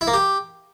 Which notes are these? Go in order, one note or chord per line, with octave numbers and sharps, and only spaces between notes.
E4
A#3
G4